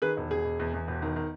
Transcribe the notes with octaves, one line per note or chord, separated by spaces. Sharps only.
D#3 G#4 B4
E1
E1 G#4
E1
E2
E2
E1
D#3
D#3